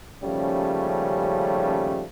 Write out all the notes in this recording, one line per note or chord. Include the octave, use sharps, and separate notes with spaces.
D#2 C#3 F3 G3 A3 C#4